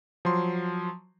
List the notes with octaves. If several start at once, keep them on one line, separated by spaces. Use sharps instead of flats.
F3 F#3 C6